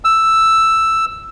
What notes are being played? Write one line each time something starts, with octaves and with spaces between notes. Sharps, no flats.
E6